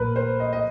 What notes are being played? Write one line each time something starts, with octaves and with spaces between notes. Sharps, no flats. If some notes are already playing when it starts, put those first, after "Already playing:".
Already playing: A#1 A#2 A#4 B4
C5
D#5
D#5